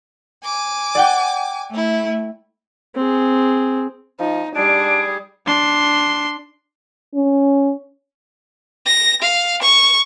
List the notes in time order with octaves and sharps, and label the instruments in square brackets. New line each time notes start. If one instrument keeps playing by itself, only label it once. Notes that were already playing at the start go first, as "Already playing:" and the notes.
[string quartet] G#5 D6
[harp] D5 F#5 G5
[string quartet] A3 E4
[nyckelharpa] C4 G#4
[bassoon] F3 [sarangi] D#4
[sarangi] G3 [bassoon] D4 [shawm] G#4 [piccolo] D7
[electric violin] D4 C6
[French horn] C#4
[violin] A#6
F5
C#6